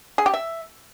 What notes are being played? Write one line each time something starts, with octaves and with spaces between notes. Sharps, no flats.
G#4
G4
E5